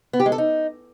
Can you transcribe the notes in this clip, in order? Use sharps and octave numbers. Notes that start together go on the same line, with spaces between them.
B3
G4
G#3
A4
D#4